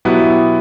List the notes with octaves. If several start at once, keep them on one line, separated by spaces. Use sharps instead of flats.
B2 F#3 B3 E4 G4